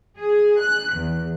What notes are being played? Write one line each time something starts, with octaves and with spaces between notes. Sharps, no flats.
G#4
F#6
E2